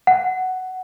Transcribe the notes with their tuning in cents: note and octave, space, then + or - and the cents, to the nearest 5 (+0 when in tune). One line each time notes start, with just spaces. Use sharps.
F#5 +10